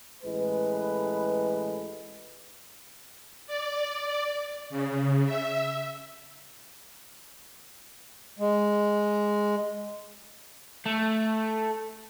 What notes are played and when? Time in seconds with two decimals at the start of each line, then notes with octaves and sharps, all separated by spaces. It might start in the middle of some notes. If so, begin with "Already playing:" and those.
0.24 A1 G#3 B4
3.47 D5
4.70 C#3
5.25 E5
8.39 G#3
10.86 A3